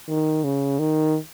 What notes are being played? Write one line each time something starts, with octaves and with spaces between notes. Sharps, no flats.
D#3
C#3
D#3